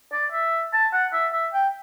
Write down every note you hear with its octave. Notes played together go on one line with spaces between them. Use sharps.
D5
E5
A5
F#5
E5
E5
G5